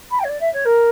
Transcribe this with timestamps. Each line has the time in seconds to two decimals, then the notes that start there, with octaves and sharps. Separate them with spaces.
0.10 B5
0.19 G5
0.24 C#5
0.28 D5
0.40 E5
0.53 C#5
0.65 A#4